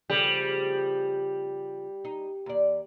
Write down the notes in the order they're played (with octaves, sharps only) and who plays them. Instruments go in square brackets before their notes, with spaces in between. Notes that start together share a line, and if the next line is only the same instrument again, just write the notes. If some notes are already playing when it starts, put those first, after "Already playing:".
[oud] C#3 F3 A3 [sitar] G3
[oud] D#4
D#2 D5